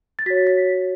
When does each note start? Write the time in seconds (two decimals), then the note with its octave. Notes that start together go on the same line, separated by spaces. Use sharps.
0.19 A6
0.26 F#4 C#5 B6
0.47 B6